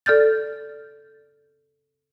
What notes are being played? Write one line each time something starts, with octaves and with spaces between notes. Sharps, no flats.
A4 D5 F6 G6 A6